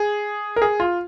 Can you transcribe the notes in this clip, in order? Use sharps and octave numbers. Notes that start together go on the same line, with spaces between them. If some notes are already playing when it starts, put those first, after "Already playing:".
Already playing: G#4
A#4
G#4
F4